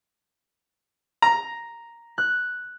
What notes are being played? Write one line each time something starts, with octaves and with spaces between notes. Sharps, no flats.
A#5
F#6